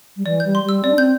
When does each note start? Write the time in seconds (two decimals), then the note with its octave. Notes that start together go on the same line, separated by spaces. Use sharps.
0.16 G3
0.25 E3 D5
0.40 G3 G6
0.55 C6
0.64 G3 E6
0.84 C4 D5
0.91 D4
0.97 C4 G6